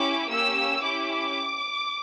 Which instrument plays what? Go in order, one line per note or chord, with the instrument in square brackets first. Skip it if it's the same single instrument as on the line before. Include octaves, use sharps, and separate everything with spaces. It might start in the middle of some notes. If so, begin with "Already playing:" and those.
Already playing: [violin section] C#4 E4 G4 D6
A#3 C#4 G4 E6
C#4 E4 G4 D6